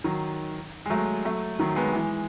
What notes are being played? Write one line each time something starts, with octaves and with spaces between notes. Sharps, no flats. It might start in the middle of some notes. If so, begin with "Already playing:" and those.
D#3 F#3
G#3
F#3 A3
F#3 A3
D#3 F#3
G#3 B3
E3 G#3